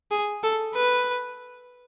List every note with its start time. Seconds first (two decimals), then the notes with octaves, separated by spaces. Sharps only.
0.11 G#4
0.43 A4
0.74 B4